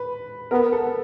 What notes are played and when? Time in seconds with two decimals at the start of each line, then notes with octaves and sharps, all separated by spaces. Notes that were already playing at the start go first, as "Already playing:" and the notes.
Already playing: B4
0.51 B3 A#4
0.72 A4